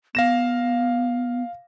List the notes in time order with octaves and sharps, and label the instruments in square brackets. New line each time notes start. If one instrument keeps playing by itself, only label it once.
[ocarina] B3 [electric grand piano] F5 A#6 E7